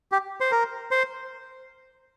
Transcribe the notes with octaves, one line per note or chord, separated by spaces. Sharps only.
G4
C5
A#4
C5